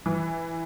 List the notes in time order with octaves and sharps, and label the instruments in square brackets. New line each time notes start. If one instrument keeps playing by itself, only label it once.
[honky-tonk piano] E3